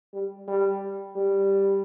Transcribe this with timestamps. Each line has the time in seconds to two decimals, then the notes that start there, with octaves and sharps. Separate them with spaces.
0.14 G3
0.48 G3
1.16 G3